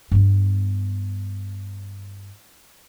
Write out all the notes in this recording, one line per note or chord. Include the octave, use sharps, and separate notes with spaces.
G2 B3